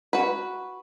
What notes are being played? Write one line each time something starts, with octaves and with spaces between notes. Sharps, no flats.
F#4 B4